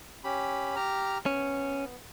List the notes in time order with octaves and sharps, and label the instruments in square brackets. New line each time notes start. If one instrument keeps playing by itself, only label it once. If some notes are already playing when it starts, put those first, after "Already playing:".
[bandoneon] C#4 G4 B5
G4 A#5 F6
[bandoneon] B3 [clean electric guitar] C#4